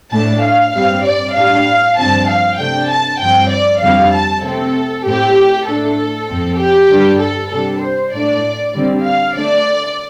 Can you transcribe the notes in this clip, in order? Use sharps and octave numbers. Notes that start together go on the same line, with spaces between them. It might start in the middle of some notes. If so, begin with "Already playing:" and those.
A2 A3 D4 A5
F5
G2 G3 C4 F5
D5
A2 G3 D4 F5
G2 D3 F3 C4 A5
F5
C3 A3 D4 G5
A5
G2 F3 C4 G5
D5
F2 D3 G3 C4 F5
A5
C3 A3 C4 A4
A2 A3 C4 G4
A2 A3 D4 A4
F2 F3 C4
G4
G2 D3 G3 D4
A4
C3 G3 D4 A4
C5
A2 A3 D4 D5
D3 G3 C4
F5
D3 A3 D4 D5